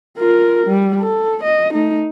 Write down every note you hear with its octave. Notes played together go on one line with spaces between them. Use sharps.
F4 A#4
G3
A4
D#5
A3 D#4